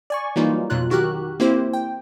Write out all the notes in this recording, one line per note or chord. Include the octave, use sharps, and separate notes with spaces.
D5 G#5 C#6
E3 F#3 G3 A#3 D#4 F4
F2 B2 F#3 F4 F#6
D#3 F#4 G4 A#4 F#6
A#3 C4 E4 G4 C5
G5